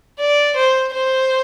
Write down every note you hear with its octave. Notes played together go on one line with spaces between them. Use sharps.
D5
C5
C5